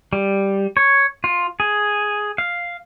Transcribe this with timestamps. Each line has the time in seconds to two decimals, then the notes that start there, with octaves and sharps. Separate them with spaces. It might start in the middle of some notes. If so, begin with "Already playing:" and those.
0.13 G3
0.77 C#5
1.24 F4
1.60 G#4
2.38 F5